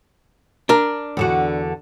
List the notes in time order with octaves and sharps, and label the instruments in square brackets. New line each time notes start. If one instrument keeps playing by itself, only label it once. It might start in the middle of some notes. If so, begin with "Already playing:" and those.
[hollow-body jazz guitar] D4 A#4
[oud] E2 D3 F#4